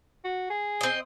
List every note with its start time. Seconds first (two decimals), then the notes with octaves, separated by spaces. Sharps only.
0.25 F#4
0.50 G#4
0.81 C4 D#5